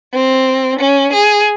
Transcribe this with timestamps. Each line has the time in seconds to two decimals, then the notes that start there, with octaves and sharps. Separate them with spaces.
0.13 C4
0.79 C#4
1.13 G#4